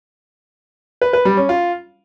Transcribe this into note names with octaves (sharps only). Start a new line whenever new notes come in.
B4
B4
G3
C#4
F4